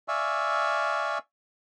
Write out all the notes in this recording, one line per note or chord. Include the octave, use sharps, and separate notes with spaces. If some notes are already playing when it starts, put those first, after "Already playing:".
D5 E5 F5 G#5 C#6 E6